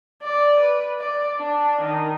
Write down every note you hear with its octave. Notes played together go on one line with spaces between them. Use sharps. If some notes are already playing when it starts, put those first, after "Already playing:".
D5
B4
D5
D4
D#3